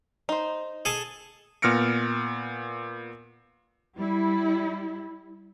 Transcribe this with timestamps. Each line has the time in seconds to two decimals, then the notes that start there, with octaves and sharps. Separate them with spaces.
0.29 D#4 C5
0.85 G#4 A4 A5
1.62 A#2 B3 F6 A#6 C#7 D7
3.97 G3 E4